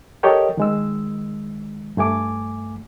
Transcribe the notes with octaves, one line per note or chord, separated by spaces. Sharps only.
G4 A4 A#4 C#5 D#5 G5
D#3 G#3 E6
G2 A3 G#5 D6